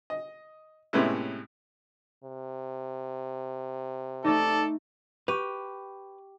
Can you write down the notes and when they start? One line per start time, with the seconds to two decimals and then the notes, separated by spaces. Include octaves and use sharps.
0.10 D#5
0.93 A2 C3 G#3 B3 C#4 E4
2.24 C3
4.24 A3 D#4 A4 D5
5.28 G4 B4 C#6 D#7 F7